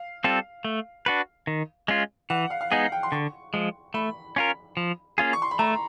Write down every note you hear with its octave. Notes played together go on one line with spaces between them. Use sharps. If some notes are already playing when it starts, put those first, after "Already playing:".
Already playing: F5
G3 C4 F4 A4
A3
D4 F#4 B4
D#3
G#3 C#4 F4
E3 F#5
F5
F5
G#3 B3 D#4 G#4 F#5
G5
C6
D3 C#6
F3 G#3
A3 B5
C#4 F4 A#4
F3
A#3 C#4 F4 G#4
C#6
C6
B5
A3 A#5